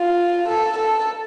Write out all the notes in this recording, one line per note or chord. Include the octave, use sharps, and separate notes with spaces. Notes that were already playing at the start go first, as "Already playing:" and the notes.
Already playing: F4
A4
A4